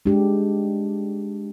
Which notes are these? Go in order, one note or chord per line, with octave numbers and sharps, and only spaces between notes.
G#3 D4 G4